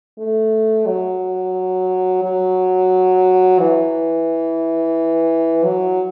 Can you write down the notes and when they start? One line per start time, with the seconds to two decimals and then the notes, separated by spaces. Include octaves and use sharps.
0.18 A3
0.87 F#3
2.23 F#3
3.59 E3
5.64 F#3